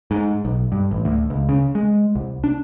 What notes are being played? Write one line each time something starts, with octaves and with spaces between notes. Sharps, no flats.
G#2
B1
G2
A1
D2
C#2
C#3
G#3
C2
D4